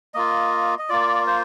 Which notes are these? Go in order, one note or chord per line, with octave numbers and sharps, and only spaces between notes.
A#3 F4 D#5
D#5
A#3 F4 D5
C5